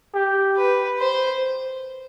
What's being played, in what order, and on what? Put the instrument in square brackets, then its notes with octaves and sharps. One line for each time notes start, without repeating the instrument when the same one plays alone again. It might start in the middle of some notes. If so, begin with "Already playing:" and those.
[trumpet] G4
[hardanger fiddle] B4
C5